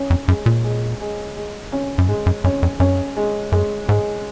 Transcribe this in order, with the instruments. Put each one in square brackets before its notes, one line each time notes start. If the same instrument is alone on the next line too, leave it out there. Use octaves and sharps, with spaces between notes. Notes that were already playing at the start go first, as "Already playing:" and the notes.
Already playing: [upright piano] C#4
[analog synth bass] F2
[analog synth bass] F#2 [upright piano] G#3
[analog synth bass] A#2
[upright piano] G#3
G#3
G#3
C#4
[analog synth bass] F#2
[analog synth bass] G#2 [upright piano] G#3
[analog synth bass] F#2
[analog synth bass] F#2 [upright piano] C#4
[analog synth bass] F2
[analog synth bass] F#2 [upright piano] C#4
[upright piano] G#3
[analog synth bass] F#2 [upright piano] G#3
[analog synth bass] G#2 [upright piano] G#3